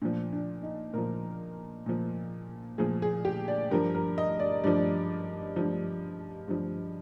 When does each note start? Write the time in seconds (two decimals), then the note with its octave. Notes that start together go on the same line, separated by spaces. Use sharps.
0.02 A#2 F3 D4
0.32 D4
0.63 D#4
0.93 A#2 F3 A#4
1.86 A#2 F3
2.78 A#2 F3 G#4
3.02 G#4
3.25 G4
3.48 D5
3.71 G2 F3 A#4
3.95 A#4
4.18 D#5
4.40 D5
4.64 G2 F3 D5
5.56 G2 F3
6.48 G2 F3